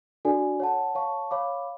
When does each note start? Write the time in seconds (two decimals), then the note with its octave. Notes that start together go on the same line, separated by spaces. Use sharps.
0.25 D4 F#4 A4 D5 G#5
0.60 C#5 F#5 A5
0.95 C#5 F5 A5 C#6
1.31 C#5 F5 B5 D6